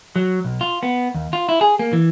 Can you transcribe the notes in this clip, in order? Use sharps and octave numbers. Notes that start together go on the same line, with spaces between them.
F#3
B1
F4
B3
D#2
F4
E4
G#4
A#3
E3